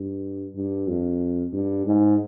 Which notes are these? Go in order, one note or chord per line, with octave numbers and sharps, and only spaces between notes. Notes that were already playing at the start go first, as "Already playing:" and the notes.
Already playing: G2
G2
F2
G2
G#2